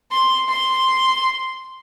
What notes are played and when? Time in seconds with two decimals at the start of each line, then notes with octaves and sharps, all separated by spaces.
0.12 C6
0.48 C6